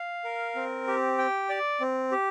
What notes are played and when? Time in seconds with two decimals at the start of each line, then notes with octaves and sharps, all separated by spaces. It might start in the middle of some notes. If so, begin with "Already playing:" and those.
Already playing: F5
0.24 A#4
0.55 C4
0.87 G4
1.18 G5
1.49 D5
1.80 C4
2.12 G4